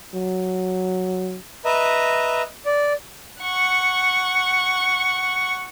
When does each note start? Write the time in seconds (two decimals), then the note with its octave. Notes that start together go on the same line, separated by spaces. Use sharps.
0.14 F#3
1.65 B4 D#5 E5 A#5
2.66 D5
3.42 F#5 C#6